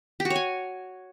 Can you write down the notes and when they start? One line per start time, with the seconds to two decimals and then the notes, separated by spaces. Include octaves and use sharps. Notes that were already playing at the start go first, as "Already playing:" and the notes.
0.20 G4
0.25 F#4
0.30 C#5
0.36 G#5